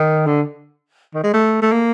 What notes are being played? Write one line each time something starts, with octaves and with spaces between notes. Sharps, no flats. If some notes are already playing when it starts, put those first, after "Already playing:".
Already playing: D#3
D3
D#3
G#3
A3
A3
A#3